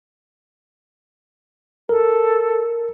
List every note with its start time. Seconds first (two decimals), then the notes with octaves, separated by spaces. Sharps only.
1.89 A4 A#4